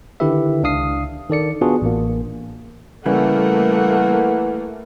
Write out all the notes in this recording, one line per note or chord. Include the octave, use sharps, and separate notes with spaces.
D3 D#3 E4 G4 B4 E5
C#2 D4 F5 D#6 C7
D#3 A4 D5 C#7
B3 D4 F4 F#4 G#4
A1 A#3
C#3 E3 G3 A3 A#3 F#5